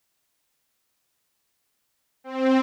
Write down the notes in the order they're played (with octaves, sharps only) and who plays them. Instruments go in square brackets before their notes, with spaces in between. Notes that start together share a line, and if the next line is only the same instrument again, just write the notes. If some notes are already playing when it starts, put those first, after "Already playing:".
[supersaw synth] C4